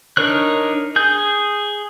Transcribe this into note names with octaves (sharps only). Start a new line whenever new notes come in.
D4 D#4 A#4 C#5 F#6
G#4 G6